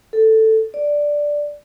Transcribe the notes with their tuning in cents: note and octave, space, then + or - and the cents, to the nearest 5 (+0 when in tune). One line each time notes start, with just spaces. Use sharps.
A4 +5
D5 +0